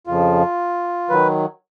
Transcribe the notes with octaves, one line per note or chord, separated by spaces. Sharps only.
F2 C#3 F3 F4
D#3 F#3 B4